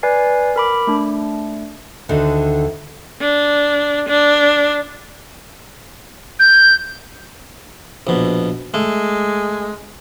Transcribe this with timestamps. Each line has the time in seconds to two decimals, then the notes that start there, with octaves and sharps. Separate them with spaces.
0.03 B4 D5 G#5 C7
0.56 A#4 B5 D6
0.87 A3 D4
2.09 D2 D3 D#3
3.21 D4
4.08 D4
6.39 G6
8.07 A#1 B2
8.74 G#3 A3